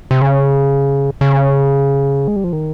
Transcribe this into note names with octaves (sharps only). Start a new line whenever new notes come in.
C3
C#3
C#3
G#3
G3
F3
D#3